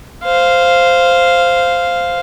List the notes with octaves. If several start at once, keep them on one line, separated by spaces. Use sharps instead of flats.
C5 F5